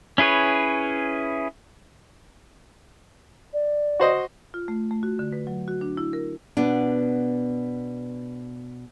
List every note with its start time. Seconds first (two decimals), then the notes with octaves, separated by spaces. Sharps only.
0.18 C#4 E4 G#4 B4 C#5
3.54 D5
4.00 F#4 C5 D#5
4.54 F4
4.68 A3
4.91 A3
5.03 F#4
5.19 D3
5.33 B4
5.47 F#3
5.68 F#4
5.81 D4
5.97 E4
6.13 A#4
6.57 B2 B3 D4